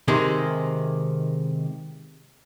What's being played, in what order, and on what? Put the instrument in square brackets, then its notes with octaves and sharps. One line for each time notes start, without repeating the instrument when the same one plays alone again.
[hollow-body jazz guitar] C3 D#3 G#3